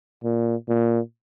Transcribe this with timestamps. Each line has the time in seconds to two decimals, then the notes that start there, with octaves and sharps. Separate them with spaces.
0.24 A#2
0.68 A#2